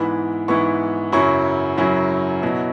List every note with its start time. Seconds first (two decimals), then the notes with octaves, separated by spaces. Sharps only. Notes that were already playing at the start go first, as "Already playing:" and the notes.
Already playing: G#2 E3 B3 E4 B5
0.48 G#2 E3 B3 E4 C#6
1.12 F#2 C#3 F#3 C#4 E4 C#6
1.77 F#2 C#3 F#3 C#4 E4
2.42 B2 F#3 E4